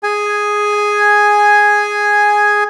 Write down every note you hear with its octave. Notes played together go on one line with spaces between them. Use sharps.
G#4 G#5